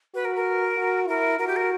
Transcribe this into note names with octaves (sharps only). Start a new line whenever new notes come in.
F#4 B4
A#4
A#4
F#4
E4 A#4
F#4 A#4
G4
A#4